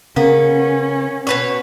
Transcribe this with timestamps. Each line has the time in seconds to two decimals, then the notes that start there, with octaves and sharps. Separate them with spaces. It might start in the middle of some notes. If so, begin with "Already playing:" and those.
0.16 C#3 A#3 B3 C#4
1.27 B2 B4 C#5